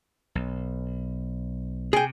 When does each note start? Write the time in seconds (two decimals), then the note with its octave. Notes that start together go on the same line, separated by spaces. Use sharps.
0.35 B1
1.93 C3 G#4 G5